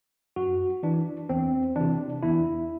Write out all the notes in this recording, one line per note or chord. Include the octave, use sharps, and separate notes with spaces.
F#2 F#4
E3 D4
E2 C4
C3 E3 D4
E2 E4